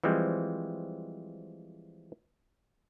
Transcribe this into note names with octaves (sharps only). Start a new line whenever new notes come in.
E3 F3 G3 G#3 C4